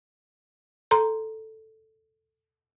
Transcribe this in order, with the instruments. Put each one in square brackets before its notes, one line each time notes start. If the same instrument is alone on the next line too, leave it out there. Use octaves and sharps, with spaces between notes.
[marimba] A4 A#5 C6